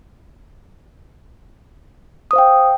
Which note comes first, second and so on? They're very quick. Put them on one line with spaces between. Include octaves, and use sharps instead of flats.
D#6 C5 F5 G5